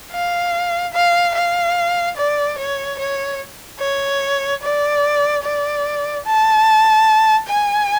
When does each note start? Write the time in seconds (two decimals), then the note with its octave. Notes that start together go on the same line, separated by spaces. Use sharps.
0.13 F5
0.94 F5
1.35 F5
2.17 D5
2.58 C#5
2.99 C#5
3.80 C#5
4.63 D5
5.43 D5
6.26 A5
7.48 G#5